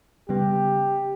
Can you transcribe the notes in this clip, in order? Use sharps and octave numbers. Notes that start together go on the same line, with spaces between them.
C#3 G3 B3 G4